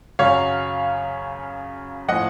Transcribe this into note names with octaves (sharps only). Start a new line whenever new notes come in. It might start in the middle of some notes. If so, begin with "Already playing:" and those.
F#2 C#3 F#3 C#5 F5
A2 F3 D#5 F#5